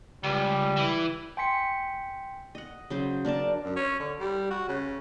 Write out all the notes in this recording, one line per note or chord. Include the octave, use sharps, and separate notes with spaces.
C#2 G3
E3
G5 G#5 C6 B6 C#7
D#5 F#5
C#3 F#3 C5
D4 A#4 D5 A5
F#2
C#4
D3
G3
F#4
C#3